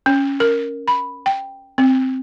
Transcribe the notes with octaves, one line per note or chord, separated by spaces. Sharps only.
C#4
A#4
B5
G5
C4